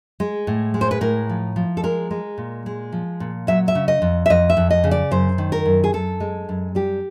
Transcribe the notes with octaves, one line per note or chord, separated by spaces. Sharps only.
G#3
A2
G#3
C5
B4
A2 A#4
F3
F3
A4
G#3 A#4
G#3
A#2
G#3
F3
A#2
F#3 E5
E5
C#3
D#5
F2
E5
F2 D#5
E5
F2
D#5
C#3
D5
F#2 C5
D#3
A#4
F#2
G#4
F#2 A4
G#3
F#2
G3 G4